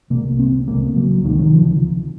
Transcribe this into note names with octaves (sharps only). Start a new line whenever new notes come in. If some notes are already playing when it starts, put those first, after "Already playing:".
C2 C3 A#3
C4
C#2 C#3 A#3
F#3
C#2 C3 D#3
D#3
F3